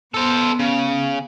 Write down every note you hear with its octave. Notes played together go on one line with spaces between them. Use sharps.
B3 A4 C5
C#3